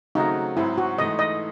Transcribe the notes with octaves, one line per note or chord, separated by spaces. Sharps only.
C#3 F#3 A3 C4 D#4 F#4
G#2 F#3 C4 E4
F#4
G#2 E3 A3 D#4 D#5
D#5